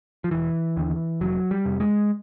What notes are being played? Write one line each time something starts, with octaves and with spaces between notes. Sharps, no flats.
F3
E1 E3
D#2 D3
F1 F#3
G3
F2 C3
G#3